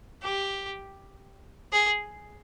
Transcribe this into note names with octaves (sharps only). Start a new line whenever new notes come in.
G4
G#4